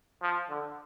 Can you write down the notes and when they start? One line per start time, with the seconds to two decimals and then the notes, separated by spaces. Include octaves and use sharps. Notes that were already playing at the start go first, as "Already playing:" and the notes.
0.22 F3
0.50 D3